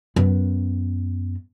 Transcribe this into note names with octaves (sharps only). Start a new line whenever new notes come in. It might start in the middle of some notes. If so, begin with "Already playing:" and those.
F#2 B3